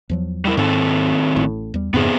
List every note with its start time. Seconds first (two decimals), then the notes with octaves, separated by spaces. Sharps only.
0.09 E2 F3 F#3
0.45 G3 E4 A#4
0.57 G#2 D#3 C4 A4
1.36 A1 A2
1.74 E2 G3
1.94 F2 G#2 C#3 B3 C4 G#4